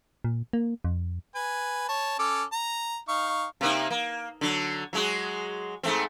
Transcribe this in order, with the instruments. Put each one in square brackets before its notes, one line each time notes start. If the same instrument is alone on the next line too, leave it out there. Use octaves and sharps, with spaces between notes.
[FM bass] A#2
A#3
F2
[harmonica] B4 G#5
C#5 A5
C#4 A4 D6
A#5
D#4 F5 C#6
[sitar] C3 A#3 D#4
A#3
D3 F#3
F#3 G#3 F#4
G#2 A3 C4